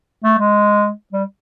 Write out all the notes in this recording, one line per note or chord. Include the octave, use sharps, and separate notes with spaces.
A3
G#3
G3